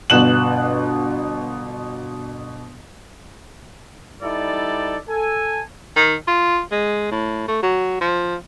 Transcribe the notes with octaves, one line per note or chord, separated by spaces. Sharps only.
G1 B2 F#6 E7 F#7
G3 D#4 E4 A4 D5
A4 G#5
D#3
F4
G#3
A2
A3
F#3
F3